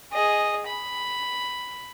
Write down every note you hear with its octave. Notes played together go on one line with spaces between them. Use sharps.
G#4 D#5
B5